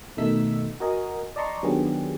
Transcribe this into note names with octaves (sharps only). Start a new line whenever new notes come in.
B2 D#3 A3 D#4 E6 B6
F#4 A#4 D#5 G#5
D5 D#5 A5 A#5 C6 C#6
D#3 F#3 B3 D4 G4 G#4